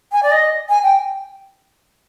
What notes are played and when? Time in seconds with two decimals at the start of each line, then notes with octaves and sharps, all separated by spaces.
0.12 G#5
0.23 D5
0.32 D#5
0.69 G#5
0.83 G5